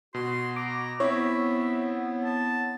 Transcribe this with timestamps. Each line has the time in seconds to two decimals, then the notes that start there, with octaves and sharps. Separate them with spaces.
0.14 B2 F#4 C6
0.56 A#5 D6
1.00 B3 C4 E4 C#5 E5
2.24 A5